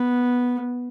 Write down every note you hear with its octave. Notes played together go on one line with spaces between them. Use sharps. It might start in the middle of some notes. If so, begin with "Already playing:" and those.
Already playing: B3